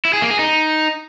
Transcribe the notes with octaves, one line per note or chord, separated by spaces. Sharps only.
E4
G#4
A#3
G#4
D#4